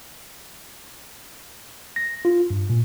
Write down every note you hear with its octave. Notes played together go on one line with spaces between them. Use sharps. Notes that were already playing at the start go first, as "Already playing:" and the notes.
A#6
F4
G2
A#2